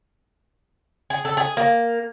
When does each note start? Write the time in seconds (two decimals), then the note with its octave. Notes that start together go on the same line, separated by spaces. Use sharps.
1.10 G#4
1.25 A4
1.37 G#4
1.57 A#3